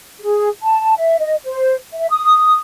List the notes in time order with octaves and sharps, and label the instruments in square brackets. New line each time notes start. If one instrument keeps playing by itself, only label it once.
[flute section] G#4
A5
E5
D#5
C5
E5
D#6